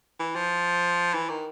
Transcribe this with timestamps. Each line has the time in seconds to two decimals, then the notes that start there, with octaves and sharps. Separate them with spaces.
0.19 E3
0.35 F3
1.14 E3
1.29 D#3